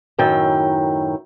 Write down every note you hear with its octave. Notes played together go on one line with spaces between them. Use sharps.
F#2 A2 D#3 G5